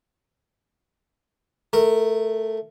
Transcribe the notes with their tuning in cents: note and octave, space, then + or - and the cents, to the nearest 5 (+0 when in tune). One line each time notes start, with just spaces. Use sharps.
A3 +0 A#4 -20